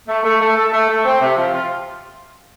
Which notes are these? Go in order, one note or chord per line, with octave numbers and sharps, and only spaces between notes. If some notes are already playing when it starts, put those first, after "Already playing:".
A3
A3
A3
A4
A3
A3
C4
C3
F3
F4